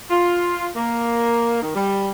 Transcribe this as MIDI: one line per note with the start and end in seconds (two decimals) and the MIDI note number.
0.11 0.68 65
0.76 1.62 58
1.62 1.71 51
1.75 2.11 55